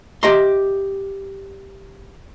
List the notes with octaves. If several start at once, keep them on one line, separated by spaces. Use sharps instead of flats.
G4 D#5 E5 A#5 C6